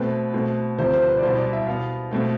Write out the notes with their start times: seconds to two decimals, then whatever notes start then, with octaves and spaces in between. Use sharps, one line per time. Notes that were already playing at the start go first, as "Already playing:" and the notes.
Already playing: B2 A3 C4 B4
0.34 B2 A3 C4
0.78 D2 C3 F3 C4 C5
0.94 C5
1.08 B4
1.18 D5
1.22 C2 B2 B3 C5
1.37 D5
1.53 E5
1.67 B2 B3 F5
2.11 B2 A3 C4